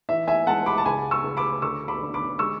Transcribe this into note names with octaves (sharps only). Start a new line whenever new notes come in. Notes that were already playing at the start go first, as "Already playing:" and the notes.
E3 E5
E5 G#5
G#3 F#5 A5
B5 D6
A5
C#2 G#5 B5
C#6 E6
C#2
B5 D6
D2 C#6 E6
B5 D6
D3
B5 D6
G#3 C#6 E6